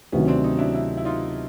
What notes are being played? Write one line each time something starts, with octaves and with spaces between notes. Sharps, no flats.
D2 C3 D#3 F#3 B3 C#4
C4 D4
C#4 D#4
D4 E4
D4 E4
E4
D#4 F4